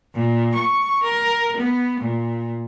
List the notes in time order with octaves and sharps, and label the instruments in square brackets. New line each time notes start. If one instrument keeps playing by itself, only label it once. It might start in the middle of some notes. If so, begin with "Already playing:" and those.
[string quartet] A#2
C#6
A#4
B3
A#2